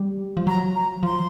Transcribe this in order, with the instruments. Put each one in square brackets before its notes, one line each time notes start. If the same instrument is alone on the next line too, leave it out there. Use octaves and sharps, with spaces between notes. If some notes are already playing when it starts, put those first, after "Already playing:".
Already playing: [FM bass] G3
F3
[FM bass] F#3 [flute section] A#5
[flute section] A#5
[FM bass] F3 [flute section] C6